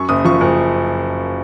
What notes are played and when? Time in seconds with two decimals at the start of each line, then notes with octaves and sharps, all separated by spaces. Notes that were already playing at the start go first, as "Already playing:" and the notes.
Already playing: F#2 C#6
0.09 F#1 D#6
0.24 F3 C#6
0.41 F#1